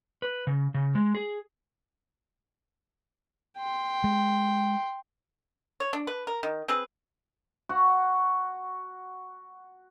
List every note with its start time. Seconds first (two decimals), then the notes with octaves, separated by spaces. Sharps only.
0.22 B4
0.47 C#3
0.74 C#3
0.95 G#3
1.15 G#4
3.58 G5 C6
4.04 G#3
5.80 C#5
5.93 D4
6.07 B4
6.27 A#4
6.43 D#3
6.68 C4 G#4 B4
7.69 F#4 F#5